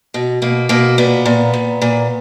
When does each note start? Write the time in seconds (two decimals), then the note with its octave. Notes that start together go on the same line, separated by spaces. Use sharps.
0.14 B2
0.42 B2 A#3
0.69 B2 A#3
0.98 A#2 B3
1.25 A#2
1.53 A#2
1.82 A#2